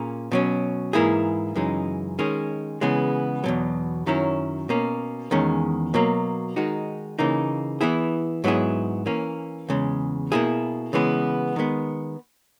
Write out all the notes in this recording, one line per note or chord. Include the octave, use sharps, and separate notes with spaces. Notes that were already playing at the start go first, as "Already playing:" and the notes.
Already playing: A#2 A#3 C#4 G#4
B2 F#3 C#4
G#2 E3 A#3 E4 G#4
F#2 C#3 E3 G#3 D#4
D#3 G#3 C#4 G#4
C#3 E3 G#3 B3
E2 B2 F#3
F#2 D#3 F#3 C#4 E4
B2 A#3 C#4
E2 D#3 G#3 C#4
B2 F#3 A#3
D#3 G#3 D#4 F#4
C#3 E3 A#3 D#4
E3 B3 E4 G#4
G#2 F#3 B3 E4 G#4
E3 A#3 C#4
E2 C#3 G#3
B2 A#3 E4 G#4
C#3 E3 G#3 B3
D#3 G#3 B3